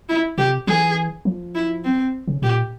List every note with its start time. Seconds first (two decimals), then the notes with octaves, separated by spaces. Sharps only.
0.09 E4
0.38 C3 G4
0.67 E3 G#4
1.25 F3
1.55 E4
1.85 C4
2.28 C#3
2.42 A#2 G4